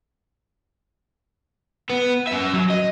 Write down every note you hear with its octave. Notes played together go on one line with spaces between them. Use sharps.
B3
F#2 E5
F#3
D#5